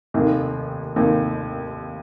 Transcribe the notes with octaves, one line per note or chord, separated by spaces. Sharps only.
F1 D#2 D#3 A#3
F1 D#2 D#3 A#3